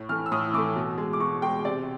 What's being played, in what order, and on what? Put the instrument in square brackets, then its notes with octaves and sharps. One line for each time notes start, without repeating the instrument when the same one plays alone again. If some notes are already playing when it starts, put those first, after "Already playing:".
Already playing: [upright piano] A2
E3 A3 F6
E6
A2 D#6
E3 A3 D6
B2
G#3
D6
B2 C#6
G#3 G5
C3 D5